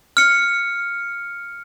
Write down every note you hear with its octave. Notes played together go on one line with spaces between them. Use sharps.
F6 C#7